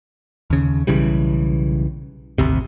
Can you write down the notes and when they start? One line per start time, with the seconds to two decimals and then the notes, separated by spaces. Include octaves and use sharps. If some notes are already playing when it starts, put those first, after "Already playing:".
0.50 D#2 C#3
0.87 B1 C#3 E3 G3
2.38 G#1 D2 C3